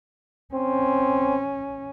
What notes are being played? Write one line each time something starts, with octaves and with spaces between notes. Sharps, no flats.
C4 C#4